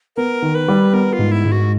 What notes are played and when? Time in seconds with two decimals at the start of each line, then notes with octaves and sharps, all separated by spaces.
0.16 B3 A#4
0.42 D#3
0.55 B4
0.68 G3
0.93 B3 A#4
1.13 F4
1.19 G#2
1.32 E4
1.45 G#2
1.52 F#4